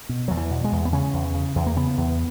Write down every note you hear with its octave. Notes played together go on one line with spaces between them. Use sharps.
B2
E2 F#3
E3
B2
G#3
E2
B3
C#3 C#4
E2
C#3
E2
A#3
C#3 B3
E2